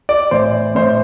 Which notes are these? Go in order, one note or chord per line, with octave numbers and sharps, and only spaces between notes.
D5
A2 E3 C5
A2 E3 C5